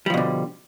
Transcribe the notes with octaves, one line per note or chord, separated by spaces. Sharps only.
B2 D3 F3 G3